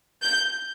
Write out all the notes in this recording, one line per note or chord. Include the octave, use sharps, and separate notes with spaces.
G6